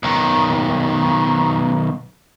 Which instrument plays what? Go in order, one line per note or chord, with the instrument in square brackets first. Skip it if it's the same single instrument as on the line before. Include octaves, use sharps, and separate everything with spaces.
[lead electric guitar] B1 D#3